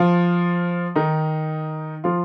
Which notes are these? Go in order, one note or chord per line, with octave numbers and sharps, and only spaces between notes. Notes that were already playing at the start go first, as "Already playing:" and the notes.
Already playing: F3 F4
D#3 D#4
F3 F4